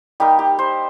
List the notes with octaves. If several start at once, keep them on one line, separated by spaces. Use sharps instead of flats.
G3 A#3 D#4 G4
G4
C5